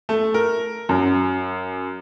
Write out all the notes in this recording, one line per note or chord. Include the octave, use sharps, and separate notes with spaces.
A3
A#4
F#2